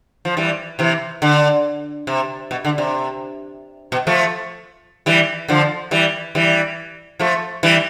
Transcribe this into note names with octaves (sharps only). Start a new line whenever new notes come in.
F3
E3 G3
C3 E3
D3
C3
B2
D3
C3
B2
F3 A3
E3 G3
D3 F3
E3 G3
E3 G3
F3 A3
E3 G3